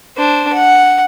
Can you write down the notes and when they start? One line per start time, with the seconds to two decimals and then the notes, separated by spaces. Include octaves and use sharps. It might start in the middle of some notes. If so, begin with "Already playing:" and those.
0.17 D4 C5
0.53 F#5